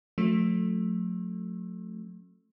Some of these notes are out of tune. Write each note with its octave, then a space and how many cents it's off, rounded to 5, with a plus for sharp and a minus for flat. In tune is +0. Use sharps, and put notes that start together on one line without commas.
F#3 -45 A3 +0 C#4 -40